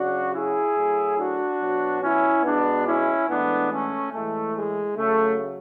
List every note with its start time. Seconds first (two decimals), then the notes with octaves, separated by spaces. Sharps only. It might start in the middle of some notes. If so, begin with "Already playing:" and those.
Already playing: C#3 F#3 D4 F#4
0.32 E4 G#4
0.75 A2 F#3
1.17 D4 F#4
1.59 B2 F#3
2.01 C#4 E4
2.43 B2 G#3 B3 D4
2.85 C#4 E4
3.27 A2 E3 G#3 B3 D4
3.70 A3 C#4
4.12 A2 E3 G#3 A3
4.54 G#3
4.96 C#3 F#3 A3